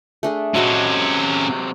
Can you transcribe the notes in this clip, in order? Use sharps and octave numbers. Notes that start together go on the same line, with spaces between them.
A3 D4 G#4
C3 F#3 G#3 C#4 F#4 A4 D#5